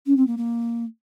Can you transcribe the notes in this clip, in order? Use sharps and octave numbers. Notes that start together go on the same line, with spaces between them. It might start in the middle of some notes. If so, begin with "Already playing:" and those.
C#4
C4
A#3
A#3